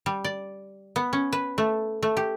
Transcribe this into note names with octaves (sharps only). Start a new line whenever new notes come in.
G3
D5
B3
C#4
B4
A3
A3
G4